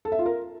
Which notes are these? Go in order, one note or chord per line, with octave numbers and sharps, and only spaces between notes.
A4
E5
F4
A#4